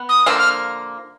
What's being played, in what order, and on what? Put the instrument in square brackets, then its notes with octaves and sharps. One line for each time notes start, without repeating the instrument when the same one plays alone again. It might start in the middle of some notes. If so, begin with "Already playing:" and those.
Already playing: [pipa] B3
[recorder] D#6
[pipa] D3 F3 A#3 [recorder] E6
[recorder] F6